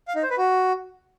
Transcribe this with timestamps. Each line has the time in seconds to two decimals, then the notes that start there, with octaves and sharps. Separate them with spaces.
0.08 F5
0.15 D#4
0.23 C5
0.30 B4
0.38 F#4